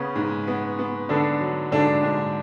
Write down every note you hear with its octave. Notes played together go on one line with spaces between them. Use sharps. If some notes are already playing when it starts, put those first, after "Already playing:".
Already playing: C#3 B3 C#4
G#2
B3
B3
D3 B3 D4
F#3
G#2 D3 D4
G#2